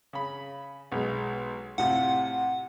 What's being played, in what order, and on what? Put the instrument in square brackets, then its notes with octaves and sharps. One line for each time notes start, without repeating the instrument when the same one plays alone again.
[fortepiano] C#3 B5
B1 G#3
[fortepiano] A2 C3 F4 [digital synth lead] F#5